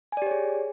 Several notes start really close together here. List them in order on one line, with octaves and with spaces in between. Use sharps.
G#5 D5 G4 C#5 G#4